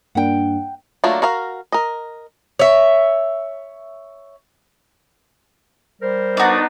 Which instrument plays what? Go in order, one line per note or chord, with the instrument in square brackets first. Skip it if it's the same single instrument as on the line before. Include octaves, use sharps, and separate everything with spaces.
[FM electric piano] G2 A#3 D4 [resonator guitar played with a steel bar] F#5 G5
[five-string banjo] F#3 A3 A#3 D4 F4
F#4 A#4 F5
A#4 D#5
[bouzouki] C#5 E5
[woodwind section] G3 A#4 C5
[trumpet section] B3 D4 D#4 [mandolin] F#4 D5